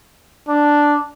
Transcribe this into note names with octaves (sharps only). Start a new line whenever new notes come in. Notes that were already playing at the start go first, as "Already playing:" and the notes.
D4